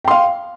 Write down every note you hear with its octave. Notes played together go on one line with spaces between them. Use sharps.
F5 G5 C6